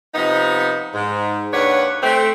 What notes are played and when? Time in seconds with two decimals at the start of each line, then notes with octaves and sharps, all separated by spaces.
0.15 C3 F3 B3 D#4
0.95 G#2
1.54 D#2 D4 B4 C#5 F#5
2.03 A3 C4